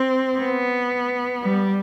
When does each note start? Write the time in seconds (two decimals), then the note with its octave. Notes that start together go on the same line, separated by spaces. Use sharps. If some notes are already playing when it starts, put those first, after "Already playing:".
Already playing: C4
0.38 B3
1.43 G3